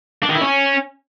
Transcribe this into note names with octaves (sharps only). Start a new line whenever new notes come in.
D4
D#3
E4
C#4